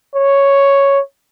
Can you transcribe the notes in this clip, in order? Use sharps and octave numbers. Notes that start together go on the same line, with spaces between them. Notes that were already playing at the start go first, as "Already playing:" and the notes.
C#5